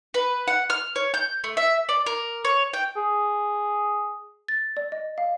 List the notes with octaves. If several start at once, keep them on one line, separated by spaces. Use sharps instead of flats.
B4
F#5
F6
C#5
G6
A3
E5
D5
A#4
C#5
G5
G#4
A6
D5
D#5
F5